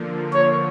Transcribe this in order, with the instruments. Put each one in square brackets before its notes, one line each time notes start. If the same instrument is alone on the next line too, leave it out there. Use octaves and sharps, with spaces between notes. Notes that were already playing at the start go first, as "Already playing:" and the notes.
Already playing: [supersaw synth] D3 F3 A#3
[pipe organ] C#5